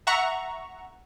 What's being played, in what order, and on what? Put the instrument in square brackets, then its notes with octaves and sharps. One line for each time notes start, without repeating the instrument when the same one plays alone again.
[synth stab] E5 F#5 A#5 C#6